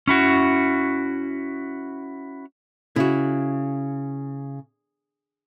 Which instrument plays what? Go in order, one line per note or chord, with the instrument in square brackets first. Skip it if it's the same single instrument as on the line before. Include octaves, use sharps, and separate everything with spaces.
[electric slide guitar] C#4 E4 F#4
[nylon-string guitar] C#3 [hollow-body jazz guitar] E4 F#4